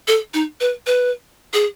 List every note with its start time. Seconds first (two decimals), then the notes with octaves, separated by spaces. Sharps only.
0.08 A4
0.34 D#4
0.60 B4
0.87 B4
1.53 G#4